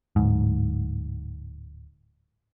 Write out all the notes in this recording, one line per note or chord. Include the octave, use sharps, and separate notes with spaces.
D1 G#2